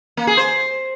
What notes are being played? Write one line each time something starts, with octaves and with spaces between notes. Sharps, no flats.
A#3
G#4
C5